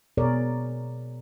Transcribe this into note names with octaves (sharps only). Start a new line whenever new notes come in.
B2 G#4 A#4 C#5 D5